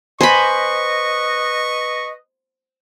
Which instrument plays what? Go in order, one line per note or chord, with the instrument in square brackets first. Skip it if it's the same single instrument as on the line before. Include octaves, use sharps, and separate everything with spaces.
[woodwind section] B4 D#5 [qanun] C5 B5 [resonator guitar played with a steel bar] G#5 [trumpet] C#6